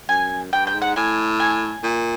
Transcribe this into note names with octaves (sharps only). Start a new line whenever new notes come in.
F#2 G#5
G2 G5
G5
G#2
F#5
A2 G#5
G#5
A#2